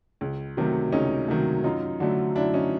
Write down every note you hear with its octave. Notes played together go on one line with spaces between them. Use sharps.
C#2
C3 D#3 F#3 A3
C#2 C#4 D#4
C3 D#3 F#3 A3
F#2 D#4 F4
D3 F#3 A3
F#2 D4 E4
C#4 D#4